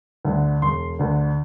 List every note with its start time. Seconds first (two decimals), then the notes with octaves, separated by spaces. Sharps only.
0.25 D2 D3
0.62 E1 C6
0.99 D2 D3